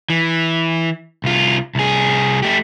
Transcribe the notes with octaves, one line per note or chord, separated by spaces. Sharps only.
E3
C2 F4
C2 G#4
A3 G4